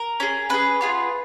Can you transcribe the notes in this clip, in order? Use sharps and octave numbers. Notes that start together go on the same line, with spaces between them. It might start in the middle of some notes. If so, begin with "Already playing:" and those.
Already playing: A#4
C#4 G#4
C#4 G#4 B4
B3 F4 G#4